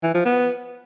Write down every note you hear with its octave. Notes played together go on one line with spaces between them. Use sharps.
E3
F3
B3